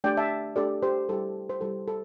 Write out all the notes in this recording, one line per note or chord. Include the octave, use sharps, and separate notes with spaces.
A3 D4 G4 D5 G5
E5 A5
A3 D4 G4 A4 D5
G4 C5
G3 E4 G4 A4
C5
G3 E4 G4 A4
A4